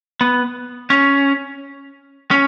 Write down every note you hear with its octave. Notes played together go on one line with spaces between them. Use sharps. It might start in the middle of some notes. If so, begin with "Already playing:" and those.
B3
C#4
C#4